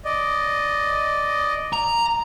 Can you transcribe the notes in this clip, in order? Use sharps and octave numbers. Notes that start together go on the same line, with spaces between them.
D5 D#5
A#5